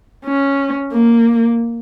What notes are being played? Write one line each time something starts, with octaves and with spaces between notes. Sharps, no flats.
C#4
A#3